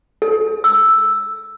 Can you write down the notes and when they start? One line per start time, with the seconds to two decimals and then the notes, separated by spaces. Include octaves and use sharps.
0.22 A4
0.64 E6